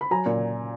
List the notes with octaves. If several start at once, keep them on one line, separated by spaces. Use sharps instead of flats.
B5
F#3 G#5 A#5
A#2